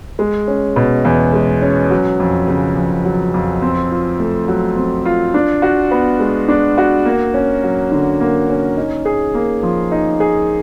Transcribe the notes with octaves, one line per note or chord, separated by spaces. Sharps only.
G#3
C#4
B2
E2
G#3
C#4
F#3
F2
C#3
F2
F#3
F2
C4
F4
A3
F#3
C4
F4
D4
F#4
B3
G#3
D4
F#4
A#3
C#4
F#3
D3
A#3
C#4
D#4
G#4
A#3
F3
D#4
G#4